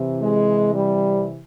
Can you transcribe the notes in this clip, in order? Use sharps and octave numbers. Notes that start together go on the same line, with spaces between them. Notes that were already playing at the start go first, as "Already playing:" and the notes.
Already playing: C3 E3
G#3
G3